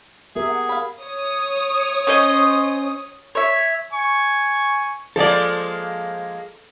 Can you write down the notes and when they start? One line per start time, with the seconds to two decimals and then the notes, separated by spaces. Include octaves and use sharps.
0.36 B3 G4 G#4 A#4 E5
0.48 F#5
0.69 F5 B5
1.02 C#5 D#6
2.07 C#4 C5 D#5
3.35 C#5 E5
3.93 G#5 C#6
5.16 F3 G#3 A#3 A4 D5